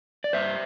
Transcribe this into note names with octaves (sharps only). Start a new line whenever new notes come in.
D5
G2 C5 E5